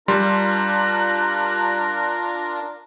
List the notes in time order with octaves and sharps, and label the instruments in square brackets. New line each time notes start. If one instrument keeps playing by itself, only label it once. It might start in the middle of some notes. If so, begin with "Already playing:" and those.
[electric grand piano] G3 C6 [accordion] D4 F4 A#4 [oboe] A#5 [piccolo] F#6